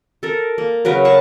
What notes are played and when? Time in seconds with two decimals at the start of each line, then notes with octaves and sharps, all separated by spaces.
0.23 A4 A#4
0.58 A#3
0.85 C#3 F#3 A#4 B4
1.05 G#4 F#5 A5 C#6